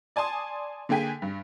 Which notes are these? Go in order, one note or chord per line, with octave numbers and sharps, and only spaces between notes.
D5 G#5 A5 C6 D#6
D3 A#3 G#4 G5 G#5 B6
G2